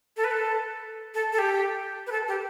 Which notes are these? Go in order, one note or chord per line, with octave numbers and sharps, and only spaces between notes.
A4
B4
A4
A4
A4
G4
B4
A4
G4